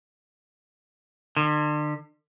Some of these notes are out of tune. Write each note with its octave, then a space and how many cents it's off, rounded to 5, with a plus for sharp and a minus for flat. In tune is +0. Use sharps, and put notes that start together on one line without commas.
D3 +40